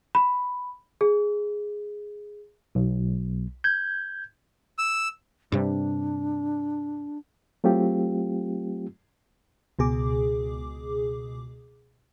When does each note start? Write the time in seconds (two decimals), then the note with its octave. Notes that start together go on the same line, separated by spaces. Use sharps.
0.15 B5
1.01 G#4
2.75 B1
3.64 G6 G#6
4.78 E6
5.52 G2 C3 G3 D4
7.64 F#3 A3 C4 F4 G4
9.79 C#2 B2 G#4 D6